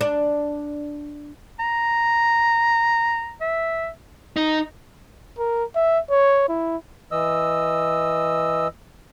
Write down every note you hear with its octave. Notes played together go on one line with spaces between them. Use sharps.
D4
A#5
E5
D#4
A#4
E5
C#5
E4
E3 D#5 E6